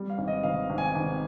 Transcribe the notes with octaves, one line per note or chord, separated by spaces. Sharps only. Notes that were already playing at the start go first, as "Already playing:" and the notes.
Already playing: G3
F5
G#1
D#5
G#1 F5
G#1
G#5
G#1